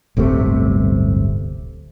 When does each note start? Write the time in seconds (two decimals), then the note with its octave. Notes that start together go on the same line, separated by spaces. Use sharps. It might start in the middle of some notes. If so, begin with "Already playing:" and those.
0.17 D1 G1 C3 A3